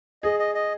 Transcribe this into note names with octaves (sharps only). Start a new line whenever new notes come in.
G#4 D#5
D#5
D#5